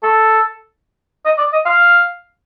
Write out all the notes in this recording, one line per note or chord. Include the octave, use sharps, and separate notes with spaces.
A4
D#5
D5
D#5
F5